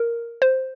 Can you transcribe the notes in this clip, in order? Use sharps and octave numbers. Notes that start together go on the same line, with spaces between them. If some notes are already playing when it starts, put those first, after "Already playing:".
Already playing: A#4
C5